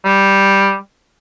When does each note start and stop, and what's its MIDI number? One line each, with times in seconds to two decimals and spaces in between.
0.05 0.76 55